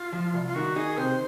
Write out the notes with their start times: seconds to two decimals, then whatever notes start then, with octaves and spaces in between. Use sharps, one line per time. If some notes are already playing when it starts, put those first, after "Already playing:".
Already playing: F4
0.13 F3
0.34 C2
0.47 F4
0.55 D#3 F#4
0.76 D#4 G#4
0.97 C3 C5